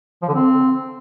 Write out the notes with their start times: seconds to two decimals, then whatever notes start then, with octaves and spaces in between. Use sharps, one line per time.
0.22 F3
0.28 D3
0.34 C4